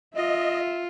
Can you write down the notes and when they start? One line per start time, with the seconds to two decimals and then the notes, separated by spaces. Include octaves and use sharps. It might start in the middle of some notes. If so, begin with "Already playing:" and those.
0.16 F4 D#5 E5